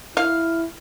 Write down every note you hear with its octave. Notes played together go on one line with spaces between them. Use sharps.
E4 F5